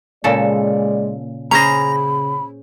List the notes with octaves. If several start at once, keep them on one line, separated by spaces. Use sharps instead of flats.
A#2 C#3 G#3 A4 D5
C#3 C#4 G#4 C5 A#5 B5 A#6